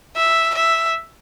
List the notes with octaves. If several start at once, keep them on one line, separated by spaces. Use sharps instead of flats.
E5
E5